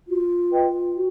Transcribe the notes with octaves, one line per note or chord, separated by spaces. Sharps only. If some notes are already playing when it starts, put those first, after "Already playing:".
F4 F#4
B4 D#5 G5
F#4